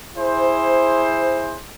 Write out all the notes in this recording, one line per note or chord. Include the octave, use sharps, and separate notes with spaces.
E4 G#4 C5